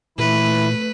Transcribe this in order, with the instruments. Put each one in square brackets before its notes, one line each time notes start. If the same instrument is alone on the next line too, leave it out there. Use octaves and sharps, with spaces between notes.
[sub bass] A#2 [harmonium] E3 E4 [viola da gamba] A3 B4